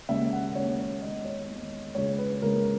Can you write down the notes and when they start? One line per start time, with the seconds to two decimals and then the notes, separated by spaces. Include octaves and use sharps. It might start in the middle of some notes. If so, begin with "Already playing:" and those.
0.09 D#2 C#3 G#3 C#4 E5
0.32 F#5
0.55 D#2 C#3 G#3 C#4 C#5
0.79 C#5
1.02 E2 D#3 G#3 D#5
1.25 C#5
1.48 E2 D#3 G#3
1.95 C#2 C#3 G#3 C#5
2.18 B4
2.42 C#2 C#3 G#3 A#4